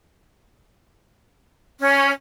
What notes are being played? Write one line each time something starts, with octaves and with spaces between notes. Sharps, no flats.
C#4